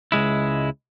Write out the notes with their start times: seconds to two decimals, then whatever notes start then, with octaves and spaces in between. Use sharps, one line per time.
0.12 C#2 G#3 E4